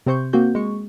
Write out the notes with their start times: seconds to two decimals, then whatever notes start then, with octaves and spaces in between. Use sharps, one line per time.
0.06 C3 C4 C5 C#6 G6
0.33 A#3 C4 F#4 G6
0.55 G#3 C#6